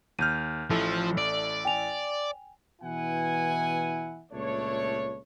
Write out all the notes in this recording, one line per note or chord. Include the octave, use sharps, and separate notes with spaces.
D#2 F6 G6 D#7
A1 F3 E4 A4
D5
G5 G#5 F7
B2 E3 E4 F#5 G#5
C#2 A#2 A3 D4 C#5